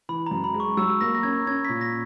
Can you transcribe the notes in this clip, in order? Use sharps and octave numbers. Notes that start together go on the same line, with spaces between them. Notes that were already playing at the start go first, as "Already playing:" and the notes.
E3 B5
F#2 A#5
B5
G#3
C#6
F#3 E6
A#3 A#6
A#6
C#4 G#6
C#4 G#6
A#2 B6
A#6